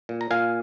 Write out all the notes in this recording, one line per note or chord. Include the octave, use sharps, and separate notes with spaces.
A#2
A#5
A#2 F5 G#5